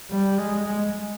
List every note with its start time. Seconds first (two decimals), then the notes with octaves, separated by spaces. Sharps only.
0.10 G3
0.38 G#3
0.66 G#3